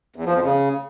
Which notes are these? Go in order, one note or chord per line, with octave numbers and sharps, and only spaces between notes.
E2
F3
F2
C#3